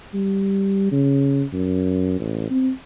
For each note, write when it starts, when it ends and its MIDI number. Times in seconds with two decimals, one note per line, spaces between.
0.14 0.87 55
0.92 1.43 49
1.53 2.19 42
2.20 2.50 33
2.51 2.71 60